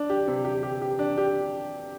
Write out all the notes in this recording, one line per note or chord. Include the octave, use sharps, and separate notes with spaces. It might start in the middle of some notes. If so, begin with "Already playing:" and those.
Already playing: D4
G4
C3
G4
G4
G4
D4
G4